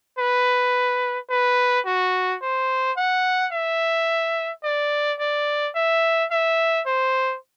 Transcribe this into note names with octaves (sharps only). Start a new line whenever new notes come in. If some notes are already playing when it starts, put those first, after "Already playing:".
B4
B4
F#4
C5
F#5
E5
D5
D5
E5
E5
C5